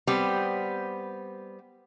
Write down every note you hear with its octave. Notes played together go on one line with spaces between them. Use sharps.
G3 B3 C4